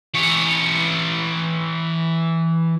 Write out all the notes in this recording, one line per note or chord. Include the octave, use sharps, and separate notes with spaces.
E3 C#5